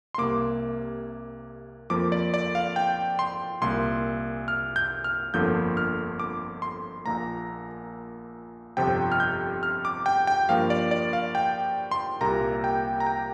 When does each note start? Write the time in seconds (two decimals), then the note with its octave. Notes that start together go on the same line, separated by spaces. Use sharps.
0.14 C6
0.18 C2 C3 A#3 D6
1.90 F2 F3 A#3 D6
2.12 D5
2.34 D5
2.55 F5
2.76 G5
3.19 C6
3.62 C2 A#2 A#3 C6
4.48 F6
4.76 G6
5.04 F6
5.34 G1 F2 D3 F3 A#3 G6
5.77 F6
6.20 D6
6.62 C6
7.06 A#1 A#2 A#3 A#5
8.77 G1 F2 C3 F3 G5
9.12 F6
9.20 G6
9.63 F6
9.85 D6
10.06 G5
10.27 G5
10.49 G2 F3 A#3 F5
10.70 D5
10.91 D5
11.13 F5
11.35 G5
11.91 C6
12.21 C2 A#2 G3 A#3 A#5
12.64 G5
13.00 A#5
13.07 G5